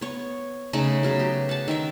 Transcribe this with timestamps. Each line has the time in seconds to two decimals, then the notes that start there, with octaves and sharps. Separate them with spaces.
0.01 B3 C#5
0.73 C#3 A3 D#4 F#5
1.03 C#3 F#3 B3
1.19 G4
1.49 F#5 A5
1.68 D#3 A#4 E5